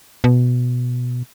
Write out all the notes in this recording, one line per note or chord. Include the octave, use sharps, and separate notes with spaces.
B2